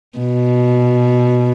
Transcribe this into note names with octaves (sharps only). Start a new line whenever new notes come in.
B2